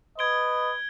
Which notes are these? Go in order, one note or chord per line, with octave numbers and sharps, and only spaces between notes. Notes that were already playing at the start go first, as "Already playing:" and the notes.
B4 D#5 G#6 D7 G7